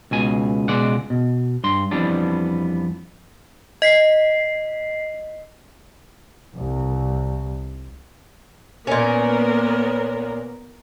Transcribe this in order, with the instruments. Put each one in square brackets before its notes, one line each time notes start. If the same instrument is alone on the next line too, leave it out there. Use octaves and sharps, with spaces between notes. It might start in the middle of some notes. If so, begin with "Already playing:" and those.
[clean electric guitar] C#2 B2 G#5
C#2 B2 G#3 D5 F#5
B2
G2 C6
F2 E3 G3 B3 D4
[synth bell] D#5 B6 C7
[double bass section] C2
[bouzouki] A#2 C#4 [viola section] A#3 B3 A#4